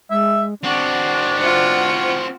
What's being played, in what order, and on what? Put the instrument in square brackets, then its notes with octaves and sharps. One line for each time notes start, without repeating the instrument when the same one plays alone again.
[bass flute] G#3 [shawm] E5
[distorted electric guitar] C4 F#4 [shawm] D4 [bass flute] F#5
[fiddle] F4 F#5 [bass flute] C5